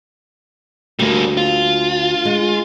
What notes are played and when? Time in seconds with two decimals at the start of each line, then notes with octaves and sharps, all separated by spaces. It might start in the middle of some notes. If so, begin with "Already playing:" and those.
0.99 D2 G3 A#3
1.37 F4
2.25 G#3